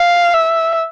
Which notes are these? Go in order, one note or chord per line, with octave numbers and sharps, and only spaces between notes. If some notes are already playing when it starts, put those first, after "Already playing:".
Already playing: F5
E5